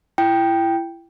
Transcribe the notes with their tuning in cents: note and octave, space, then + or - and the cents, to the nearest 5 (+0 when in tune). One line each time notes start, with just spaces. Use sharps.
E4 +30 G5 +0